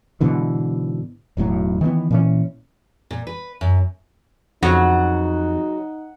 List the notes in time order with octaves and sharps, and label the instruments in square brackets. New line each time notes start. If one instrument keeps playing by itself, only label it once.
[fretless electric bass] G#2 B2 D3 E3
E1 B1 A2 F#3
D#3 E3 A3 B3
A#2 E3 C#4
[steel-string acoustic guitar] A#2
B4
F#2
[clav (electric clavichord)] F2 [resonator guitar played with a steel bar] C#3 F#3 [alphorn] D#4 [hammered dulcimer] F#5